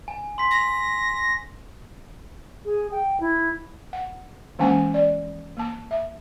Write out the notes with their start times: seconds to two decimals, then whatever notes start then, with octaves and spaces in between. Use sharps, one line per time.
0.08 G#5
0.38 C6 B6
0.51 A#6
2.65 G#4
2.91 G5
3.20 E4
3.93 F#5
4.59 E3 G#3 A#3 C#4 F#5 G#5
4.94 D5
5.57 A#3 A5
5.91 E5